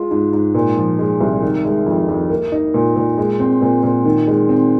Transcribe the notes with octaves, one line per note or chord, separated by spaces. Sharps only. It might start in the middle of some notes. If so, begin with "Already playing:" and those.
Already playing: G#3 F4
G#2
G#2
A#2
F3
G#3
C2
D#3
G#3
F2
F2
A#3
D#4
A#2
A#2
G#3
C4
A#2
A#2
D#3
G#3
C4